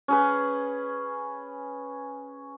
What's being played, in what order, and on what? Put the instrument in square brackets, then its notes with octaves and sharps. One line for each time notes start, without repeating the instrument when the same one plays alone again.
[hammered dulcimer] C#4 G#4 B4